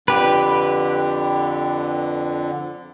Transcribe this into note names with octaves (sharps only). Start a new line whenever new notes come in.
F2 D3 G4 B4